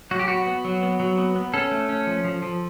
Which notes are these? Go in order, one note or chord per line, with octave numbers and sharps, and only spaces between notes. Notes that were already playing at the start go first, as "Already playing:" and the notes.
F#3 F#4
G4
B3 F#4
B3
F#3
B3
F#3
B3
B3
C#4 A4
A3
C#4
F3
F3
F3